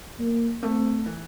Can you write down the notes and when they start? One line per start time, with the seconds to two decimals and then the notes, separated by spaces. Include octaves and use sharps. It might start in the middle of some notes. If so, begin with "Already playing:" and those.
0.19 G3 A#3
0.63 A3 C4
1.06 E3